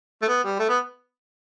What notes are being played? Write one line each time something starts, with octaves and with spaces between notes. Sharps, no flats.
A3
B3
G3
A3
B3